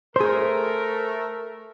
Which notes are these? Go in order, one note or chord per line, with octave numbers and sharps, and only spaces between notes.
A3 G#4 A#4 C5